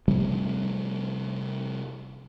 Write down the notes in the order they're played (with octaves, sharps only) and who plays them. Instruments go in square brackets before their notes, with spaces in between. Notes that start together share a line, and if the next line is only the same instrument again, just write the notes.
[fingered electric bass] C3 F3 G3 A3